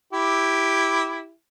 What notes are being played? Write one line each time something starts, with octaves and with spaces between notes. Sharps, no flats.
E4 G4